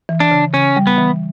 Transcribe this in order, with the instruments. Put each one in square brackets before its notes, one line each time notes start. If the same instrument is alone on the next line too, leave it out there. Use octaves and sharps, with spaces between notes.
[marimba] E3
[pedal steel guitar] D4
[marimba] C#3
[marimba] C#3 [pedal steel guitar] C#4
[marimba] G3
[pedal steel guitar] B3
[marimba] E3